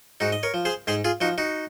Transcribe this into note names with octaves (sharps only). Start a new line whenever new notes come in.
G#2 D#4 F#4
D#5
A#4 C#5
F3
G#4 C5
G#2 G#4 C5
F4 G#4
F3 D#4 F#4
D#4 F#4